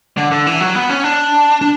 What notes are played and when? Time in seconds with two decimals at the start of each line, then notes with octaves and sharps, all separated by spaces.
0.17 D3
0.32 D3
0.47 E3
0.61 F#3
0.75 B3
0.90 C#4
1.04 D4
1.61 D4